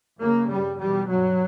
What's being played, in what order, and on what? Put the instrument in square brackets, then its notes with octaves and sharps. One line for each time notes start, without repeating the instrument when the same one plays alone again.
[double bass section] F#2 C#3 A#3
G2 G3
E2 B2 G3
G2 F#3